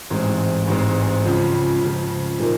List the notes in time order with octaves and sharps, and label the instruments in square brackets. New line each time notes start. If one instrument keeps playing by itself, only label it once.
[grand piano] A1 G#2 E3 G#3 C4
A1 G#2 E3 G#3 C4
C#2 C#3 F3
C#2 C#3 F3
A#2 F3 A#3 D#4